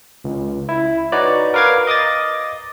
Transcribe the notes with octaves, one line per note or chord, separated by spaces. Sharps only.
C#2
E4
D#4 F#4 B4 C#5 D5
A#4 B4 F5 D6 G#6
D#5 D6 D#6 A6